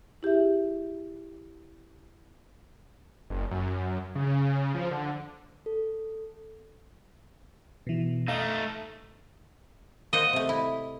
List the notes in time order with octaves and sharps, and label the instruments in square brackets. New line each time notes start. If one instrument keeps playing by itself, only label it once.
[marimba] E4 G4 G#4 E5
[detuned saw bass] F#1
F#2
C#3
F3
D3
[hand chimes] A4
[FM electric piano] B2 E3
[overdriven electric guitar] A3 D#4 [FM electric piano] D#5 F5
[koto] A#3 C5 F#5 [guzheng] D#5
[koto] C3 A3
E4